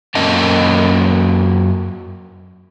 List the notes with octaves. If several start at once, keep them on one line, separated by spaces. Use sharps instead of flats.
F#2 A#3 C#4 D#5 A5